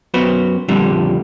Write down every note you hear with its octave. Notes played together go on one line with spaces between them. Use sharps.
F#2 B3 F#4 C5
F2 A#2 D3 G3